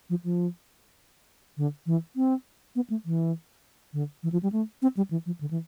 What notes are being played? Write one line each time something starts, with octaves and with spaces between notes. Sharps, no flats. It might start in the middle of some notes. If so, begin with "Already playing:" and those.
F3
F3
D3
E3
C4
B3
A3
E3
D3
E3
F3
G3
A3
C4
G3
E3
F3
D3
E3